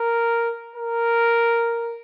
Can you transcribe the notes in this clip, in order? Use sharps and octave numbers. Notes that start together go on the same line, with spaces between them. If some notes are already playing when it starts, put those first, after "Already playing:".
Already playing: A#4
A#4